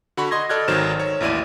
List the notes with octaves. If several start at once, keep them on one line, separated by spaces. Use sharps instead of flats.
D3 F#4 B5 C#6
D#5 C6 G#6 A#6
A4 D5 D#5 F6 F#6 G#6
G#1 D#3 F#3 C5 F6 E7
C#5
A1 D#2 E4 D5 D#7